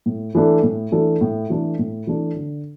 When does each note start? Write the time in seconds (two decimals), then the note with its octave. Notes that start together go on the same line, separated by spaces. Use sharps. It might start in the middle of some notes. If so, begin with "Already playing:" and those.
0.06 A2
0.35 E3 A3 D4 A4
0.63 A2
0.92 E3 A3 D4 A4
1.21 A2
1.50 E3 A3 D4 A4
1.79 A2
2.07 E3 A3 D4 A4
2.36 D3